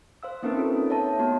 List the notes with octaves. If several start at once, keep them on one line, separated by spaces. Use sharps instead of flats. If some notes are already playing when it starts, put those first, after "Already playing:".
C5 F5 E6
A#3 C4 C#4 D#4 A#4 B4
F4 A4 B4 C#5
C#5 E5 A5
A3 B3 F#4 A5